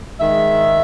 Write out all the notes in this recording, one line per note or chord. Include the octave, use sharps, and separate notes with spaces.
G#2 D#3 G#3 E5